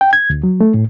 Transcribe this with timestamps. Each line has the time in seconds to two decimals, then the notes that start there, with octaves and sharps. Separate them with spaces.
0.01 G5
0.13 G#6
0.30 D2
0.43 F#3
0.61 A3
0.74 A2